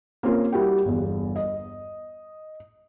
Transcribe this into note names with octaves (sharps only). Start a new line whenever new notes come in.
A#3 C4 C#4 F4 A#4
G3 E4 F#4 A#4 G5
G1 E2
D#5